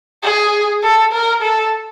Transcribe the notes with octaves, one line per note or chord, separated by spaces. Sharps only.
G#4
A4
A#4
A4